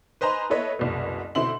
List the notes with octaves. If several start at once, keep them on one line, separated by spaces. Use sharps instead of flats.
B4 C5 D#5 G#5 A#5 C6
E4 A4 B4 C#5 D#5 E5
F#1 C2 B2
B2 D3 C4 E4 C6 F#7